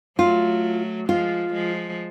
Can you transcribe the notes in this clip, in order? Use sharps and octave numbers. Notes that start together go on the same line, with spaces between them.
F#3 A3 F4
F3 G#3 F4
F3 G#3